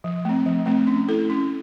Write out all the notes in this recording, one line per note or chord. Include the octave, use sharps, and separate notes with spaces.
F3
A3 C4
F3
A3 C4
C#4
E4 A4
C#4